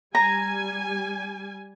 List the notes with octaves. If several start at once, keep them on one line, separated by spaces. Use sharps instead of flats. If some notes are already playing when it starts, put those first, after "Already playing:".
G3 G#5 A#5